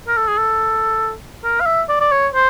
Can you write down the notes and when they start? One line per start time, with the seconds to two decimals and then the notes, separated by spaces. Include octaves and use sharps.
0.08 A#4
0.17 A4
0.28 G#4
0.38 A4
1.44 A#4
1.60 F5
1.66 E5
1.89 D5
2.01 D5
2.12 C#5
2.34 C5